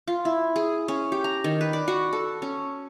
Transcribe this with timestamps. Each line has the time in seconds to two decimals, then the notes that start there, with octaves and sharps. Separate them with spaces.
0.08 F4
0.25 E4
0.56 G#4
0.88 C#4
1.12 G4
1.24 A#5
1.44 D#3
1.61 B4
1.73 D5
1.88 F#4
2.13 A4
2.42 C#4